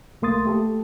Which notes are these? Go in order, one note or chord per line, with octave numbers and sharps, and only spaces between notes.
C2 A3 A#3 C6 D#6 A6
A3 G4 A4